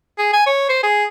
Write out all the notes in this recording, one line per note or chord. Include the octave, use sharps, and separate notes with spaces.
G#4
G#5
C#5
C5
G#4